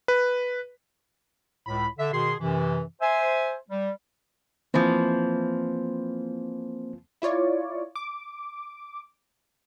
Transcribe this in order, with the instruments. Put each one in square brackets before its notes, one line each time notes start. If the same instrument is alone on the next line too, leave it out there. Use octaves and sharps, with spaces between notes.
[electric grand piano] B4
[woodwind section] C#2 A2 B5
D3 E5
B2 D#3 G#4 C6
F#2 C3 E3
C5 E5 G#5
G3
[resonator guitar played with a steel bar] E3 F3 [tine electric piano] A#3 C4 C5
[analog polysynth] E4 F4 C#5 D5
D6